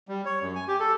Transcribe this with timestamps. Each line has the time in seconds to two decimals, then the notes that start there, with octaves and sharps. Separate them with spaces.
0.08 G3
0.25 C#5
0.42 F#2
0.55 G#5
0.68 G4
0.80 A4